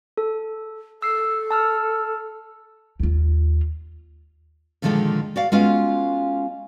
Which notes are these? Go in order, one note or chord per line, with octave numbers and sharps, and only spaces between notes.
A4
A4 E6 C7
A5 E6 F6
D#2 F4
A#2 D3 D#3 F3 G#3 A4
F#4 D5 F5
G#3 B3 C#4 F4 F#4 F5